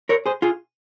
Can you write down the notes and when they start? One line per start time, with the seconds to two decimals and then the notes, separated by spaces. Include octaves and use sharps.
0.09 A#4 C#5
0.26 G#4 C5
0.42 F4 G#4